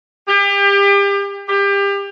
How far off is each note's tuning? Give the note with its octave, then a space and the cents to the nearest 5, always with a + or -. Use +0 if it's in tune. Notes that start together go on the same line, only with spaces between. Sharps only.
G4 +35
G4 +30